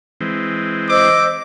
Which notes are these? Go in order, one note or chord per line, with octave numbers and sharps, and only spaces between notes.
E3 G#3 C4
C5 D#5 D6 E6